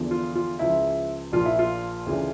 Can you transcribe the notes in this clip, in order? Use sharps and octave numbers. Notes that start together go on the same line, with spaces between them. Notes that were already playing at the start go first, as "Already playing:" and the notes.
Already playing: E2 D3 F3
F4
F4
C#2 C#3 F3 E4
A#1 A#2 F3 F4
E4
F4
D2 C#3 E3